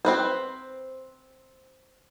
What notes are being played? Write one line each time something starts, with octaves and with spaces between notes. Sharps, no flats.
C4 B4 C5